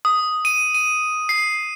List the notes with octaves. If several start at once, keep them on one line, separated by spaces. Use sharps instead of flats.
D#6
D#7
D#7
C7